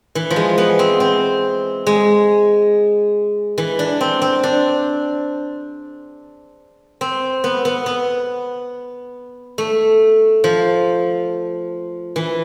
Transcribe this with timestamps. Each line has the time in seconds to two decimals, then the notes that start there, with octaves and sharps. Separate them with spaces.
0.15 E3
0.31 F3
0.36 G#3
0.58 B3
0.79 C4
1.00 C4
1.86 G#3
3.58 E3
3.79 D4
4.01 C4
4.22 C4
4.43 D4
7.01 C4
7.44 B3
7.65 B3
7.86 B3
9.58 A3
10.44 F3
12.16 E3